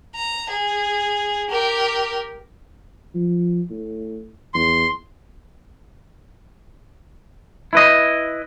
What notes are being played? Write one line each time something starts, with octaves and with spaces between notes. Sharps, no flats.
A#5
G#4
G4 A#4
F3
A2
E2 C6
E4 B4 D#5